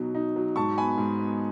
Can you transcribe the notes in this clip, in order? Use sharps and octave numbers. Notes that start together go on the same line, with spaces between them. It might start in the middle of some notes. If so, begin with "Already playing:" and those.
Already playing: B2 F#3 D#4
D#4
F#3
G#2 A5 C#6
B3 G#5 B5
G#2
B3